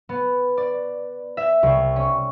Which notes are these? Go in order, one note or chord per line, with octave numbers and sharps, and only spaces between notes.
B3
D5
E5
C2
C#4